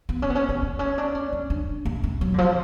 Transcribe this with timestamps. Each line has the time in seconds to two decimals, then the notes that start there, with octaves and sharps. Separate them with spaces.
0.09 B3
0.22 C#4
0.30 B3
0.35 C#4
0.49 B3
0.62 B3
0.79 C#4
0.98 D4
1.15 C#4
1.33 C#4
1.50 D4
1.85 A3
2.03 A3
2.21 F#3
2.34 D3
2.38 F3